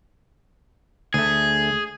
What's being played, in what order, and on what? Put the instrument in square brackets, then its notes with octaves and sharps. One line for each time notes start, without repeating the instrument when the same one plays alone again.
[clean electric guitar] D2 A3 [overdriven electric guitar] G#4